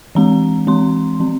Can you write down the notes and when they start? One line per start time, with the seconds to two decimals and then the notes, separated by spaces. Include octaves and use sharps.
0.15 E3 G#3 C4 A#5
0.67 E3 G#3 C4 C6
1.20 F3 C4